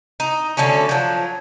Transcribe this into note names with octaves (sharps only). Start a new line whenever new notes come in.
D#4
D3 F#3 A3 C#4
F3 F#3